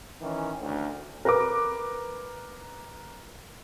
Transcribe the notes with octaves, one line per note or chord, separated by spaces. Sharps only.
D#3 E3 C#4
D2
A#4 B4 A#5 D6